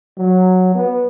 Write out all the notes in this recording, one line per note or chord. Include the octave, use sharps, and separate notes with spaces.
F#3
B3